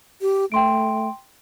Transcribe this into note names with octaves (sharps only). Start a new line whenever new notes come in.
G4
A3 G5 C6 D7